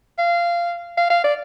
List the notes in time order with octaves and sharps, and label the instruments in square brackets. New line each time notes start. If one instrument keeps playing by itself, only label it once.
[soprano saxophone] F5
F5
F5
D5